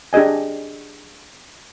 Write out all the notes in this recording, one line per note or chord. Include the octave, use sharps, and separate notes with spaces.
D4 G4 G#4 D#5 G#5